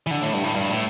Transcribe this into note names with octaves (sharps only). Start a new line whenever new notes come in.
E3
D3
A2
G2
A2
G2
A2